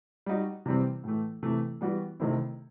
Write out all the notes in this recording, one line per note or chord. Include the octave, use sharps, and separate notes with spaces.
G3 D#4 F#4
C3 E3 G3 C4
A2 E3 A3
C3 E3 A3
E3 G3 B3 F#4
C3 D#3 A3 C4 E4